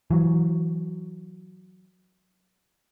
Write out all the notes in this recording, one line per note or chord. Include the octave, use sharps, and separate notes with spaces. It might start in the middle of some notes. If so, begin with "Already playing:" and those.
E3 F#3